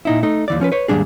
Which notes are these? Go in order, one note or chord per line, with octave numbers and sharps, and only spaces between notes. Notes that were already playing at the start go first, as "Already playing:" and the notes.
A#2 D#4 E4
A3 D#4
D#2 E3 D5
F3 C#4 A#4 B4
B4 C#5
D#2 G#2 D#3 G3 D4 G#4